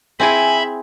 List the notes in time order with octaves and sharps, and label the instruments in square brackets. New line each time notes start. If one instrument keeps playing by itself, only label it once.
[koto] C4 E4 G#4 [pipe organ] E5 B5 [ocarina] G#5